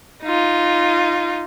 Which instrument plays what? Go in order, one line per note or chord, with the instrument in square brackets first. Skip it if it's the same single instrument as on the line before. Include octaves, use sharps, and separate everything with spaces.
[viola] D#4 F4